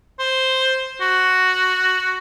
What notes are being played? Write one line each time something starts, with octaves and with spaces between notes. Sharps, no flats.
C5
F#4